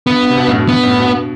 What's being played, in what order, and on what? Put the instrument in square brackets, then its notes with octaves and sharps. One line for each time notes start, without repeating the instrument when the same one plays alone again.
[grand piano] G2 [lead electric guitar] B3
[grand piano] G2
C3
G2 B2
F#2 A2
G2 B2
[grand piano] G2 [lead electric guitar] B3
[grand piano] F#2 A2
G2 B2